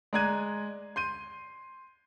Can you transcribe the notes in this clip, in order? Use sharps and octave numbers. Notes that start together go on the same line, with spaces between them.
G#3 D5 A#5 F#6 G#6 D#7
C6 G6 D#7